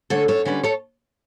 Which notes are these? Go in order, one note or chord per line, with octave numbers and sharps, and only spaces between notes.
D3 A3 C#4 A4 C#5
F#2 A4 C#5
D3 G3 C#4 B4 D5
A4 C#5